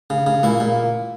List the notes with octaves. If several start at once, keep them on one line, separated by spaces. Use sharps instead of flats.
C#3
C#3
A#2 E4
A#2